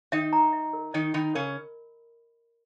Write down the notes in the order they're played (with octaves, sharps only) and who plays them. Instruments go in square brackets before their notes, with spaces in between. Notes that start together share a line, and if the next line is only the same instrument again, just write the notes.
[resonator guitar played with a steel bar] D#3 D#4 [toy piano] E5
[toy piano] A#5
E5
A#4
[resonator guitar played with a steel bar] D#3 D#4 [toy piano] D#5
[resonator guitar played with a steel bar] D#3 D#4 [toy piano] B5
[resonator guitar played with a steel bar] C#3 C#4 [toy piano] A#4